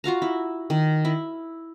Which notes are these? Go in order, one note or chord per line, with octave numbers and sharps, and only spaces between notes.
F4 F#4 F5 A#5
E4
D#3
E4